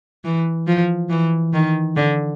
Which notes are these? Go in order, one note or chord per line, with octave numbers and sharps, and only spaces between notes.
E3
F3
E3
D#3
D3